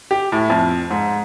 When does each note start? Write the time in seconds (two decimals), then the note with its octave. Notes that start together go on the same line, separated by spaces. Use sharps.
0.11 G4
0.32 A2
0.50 F2
0.90 G#2